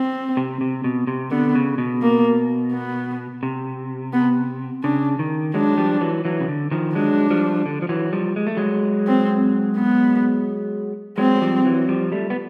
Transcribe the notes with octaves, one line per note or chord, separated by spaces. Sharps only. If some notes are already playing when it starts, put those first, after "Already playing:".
Already playing: C4
C3
C3
B2
C3
D3 B3
C#3
B2
A#3
B3
C3
B3
C#3 D4
D#3
F#3 G#3 D4
F3 G3
E3 F#3
E3 F#3
C#3
D3
D#3 F3
F#3 G#3 D4
F3 G3
D3
F3
E3 F#3
F3 G3
G#3
A3
F#3 G#3
C4
B3
F#3 G#3 C4
F3 G3
E3 F#3
F3 G3
G3 A3
B3